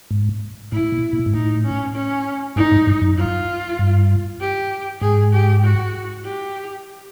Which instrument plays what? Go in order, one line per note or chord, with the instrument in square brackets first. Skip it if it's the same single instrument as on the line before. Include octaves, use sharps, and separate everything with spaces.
[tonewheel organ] G#2
[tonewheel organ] A2 [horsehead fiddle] E4
[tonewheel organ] A#2
A#2
G#2
[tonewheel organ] A2 [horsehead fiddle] D#4
[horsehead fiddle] C#4
C#4
[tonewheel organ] G#2 [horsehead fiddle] D#4
[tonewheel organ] G#2
G2
F#2
[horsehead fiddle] F4
[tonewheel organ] G2
[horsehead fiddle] G4
[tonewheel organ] G#2 [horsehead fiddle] G#4
[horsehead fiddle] G4
F#4
G4